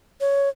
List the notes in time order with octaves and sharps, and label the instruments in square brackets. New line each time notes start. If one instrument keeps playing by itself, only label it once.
[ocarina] C#5